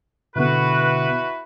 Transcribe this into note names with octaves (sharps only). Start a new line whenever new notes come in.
B2 D3 B3 E4 F#4 B4